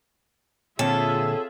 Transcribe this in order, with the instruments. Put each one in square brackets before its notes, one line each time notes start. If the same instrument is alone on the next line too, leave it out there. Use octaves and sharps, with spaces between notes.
[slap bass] A#2 D3 [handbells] C4 C#5 [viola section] F4 G#4 E5 [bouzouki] A4